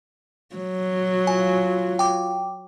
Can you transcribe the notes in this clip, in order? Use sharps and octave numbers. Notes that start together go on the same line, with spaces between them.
F#3
F4 G#5
G5 D6